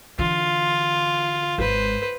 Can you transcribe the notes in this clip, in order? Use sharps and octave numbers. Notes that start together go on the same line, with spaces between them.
D3 E3 F4
G#1 G#3 B4 C5